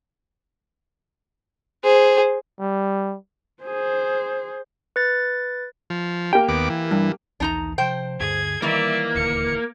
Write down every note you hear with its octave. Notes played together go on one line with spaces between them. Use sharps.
G#4 C5
G3
G#4 C5
B4 A6
F3
A#3 G4 G5
D#2 B3 D6
E3
G2
A#1 D#2 E3 D4 D#4 A#5
C3 F3 C5 G5
D2 G2 D3 G#4 G#6
D#3 E3 G3 A#3 D5 E5
D#1 D2 D3 C#7